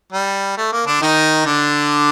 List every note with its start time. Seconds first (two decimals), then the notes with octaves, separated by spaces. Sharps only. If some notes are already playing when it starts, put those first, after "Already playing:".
0.12 G3
0.57 A3
0.72 A#3
0.86 D3 D4
1.01 D#3 D#4
1.46 D3 D4